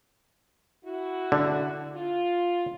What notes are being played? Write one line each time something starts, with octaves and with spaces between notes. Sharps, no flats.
E4 F#4
D3
F4